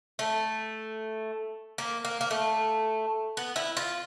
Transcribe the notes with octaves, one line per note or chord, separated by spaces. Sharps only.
A3
A#3
A#3
A#3
A3
B3
E4
F4